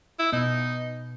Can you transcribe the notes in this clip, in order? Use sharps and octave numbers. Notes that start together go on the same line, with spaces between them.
E4
B2 B3 D#4